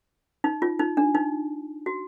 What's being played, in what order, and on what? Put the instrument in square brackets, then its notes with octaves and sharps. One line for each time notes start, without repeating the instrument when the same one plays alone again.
[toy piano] D#4
F4
D#4
D4
D#4
F#4